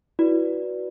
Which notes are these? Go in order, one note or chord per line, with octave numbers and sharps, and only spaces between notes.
E4 F#4 B4 D5